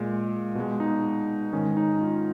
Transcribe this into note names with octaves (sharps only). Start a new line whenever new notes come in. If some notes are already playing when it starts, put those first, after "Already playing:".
Already playing: A#2 G#3
B2 G#3
D#4
G#2 D#3 G#3 C#4
D#4
F4